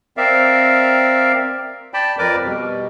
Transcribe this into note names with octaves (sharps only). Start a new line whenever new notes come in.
C4 A#4 D5 E5 F5
D5 G5 A5 B5
F2 A#4 B4 D5 D6
B2 G3